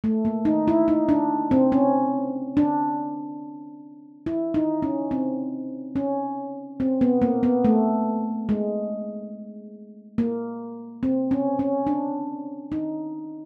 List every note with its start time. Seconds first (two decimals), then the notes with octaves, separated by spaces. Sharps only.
0.04 A3
0.25 A#3
0.45 D#4
0.68 E4
0.88 D#4
1.09 D4
1.51 C4
1.72 C#4
2.57 D4
4.26 E4
4.54 D#4
4.82 C#4
5.11 C4
5.96 C#4
6.80 C4
7.01 B3
7.22 A#3
7.43 B3
7.65 A3
8.49 G#3
10.18 A#3
11.03 C4
11.31 C#4
11.59 C#4
11.87 D4
12.72 D#4